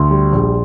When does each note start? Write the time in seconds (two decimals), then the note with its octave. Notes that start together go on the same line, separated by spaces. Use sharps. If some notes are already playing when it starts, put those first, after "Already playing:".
Already playing: D2 C6
0.11 G3
0.33 A#1